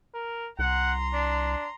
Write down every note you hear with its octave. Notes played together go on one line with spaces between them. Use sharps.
A#4
C2 F#5 A#5 C6
D4